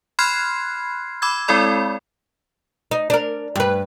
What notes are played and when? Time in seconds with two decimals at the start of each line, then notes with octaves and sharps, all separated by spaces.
0.19 B5 C6 F6 F#6 G#6 C7
1.22 B5 D6 E6 G#6
1.48 G#3 C4 E4 A4 D5 B5
2.91 D#4
3.10 D4 A#4
3.56 G2 B4